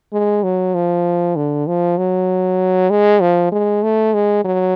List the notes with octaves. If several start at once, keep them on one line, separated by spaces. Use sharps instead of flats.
G#3
F#3
F3
D3
F3
F#3
G#3
F3
G#3
A3
G#3
F#3